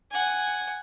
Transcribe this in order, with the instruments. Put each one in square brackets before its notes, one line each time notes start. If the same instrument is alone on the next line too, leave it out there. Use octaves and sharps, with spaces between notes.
[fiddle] F#5 G#5